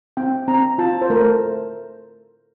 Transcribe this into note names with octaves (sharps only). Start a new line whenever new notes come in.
C4 G5
C4 A#5
F4 A5
C5
A3 A#4